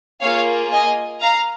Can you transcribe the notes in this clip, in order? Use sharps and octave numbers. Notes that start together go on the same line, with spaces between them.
A#3 F4 G#4 C#5 F5
D#5 G#5
F5 A#5